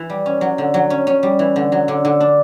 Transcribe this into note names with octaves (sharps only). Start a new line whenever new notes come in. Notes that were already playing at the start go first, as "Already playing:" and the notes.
Already playing: E3
G3
C#4
F#3
D3
F#3
C#4
C#4
G3
E3
D3
F#3
D3
D3
D4